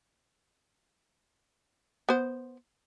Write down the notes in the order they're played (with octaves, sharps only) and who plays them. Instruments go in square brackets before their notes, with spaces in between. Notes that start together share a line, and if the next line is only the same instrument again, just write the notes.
[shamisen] B3 C5